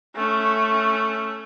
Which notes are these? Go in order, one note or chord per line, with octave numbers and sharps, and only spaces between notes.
A3 C#4